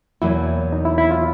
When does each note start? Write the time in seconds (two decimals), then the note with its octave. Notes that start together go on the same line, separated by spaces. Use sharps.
0.22 E2 B2 F#3 A#3 E4
0.72 D#4
0.85 E4
0.98 E4
1.11 F4